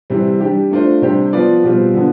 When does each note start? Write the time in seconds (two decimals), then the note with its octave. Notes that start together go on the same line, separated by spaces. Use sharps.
0.10 C3 E3 G3 C4
0.40 G3 D4 G4
0.71 A3 D4 F4 C5
1.02 C3 G3 D4 G4 C5
1.33 F3 B3 F4 B4 D5
1.64 B2 G3 C4 F4
1.94 D3 F3 B3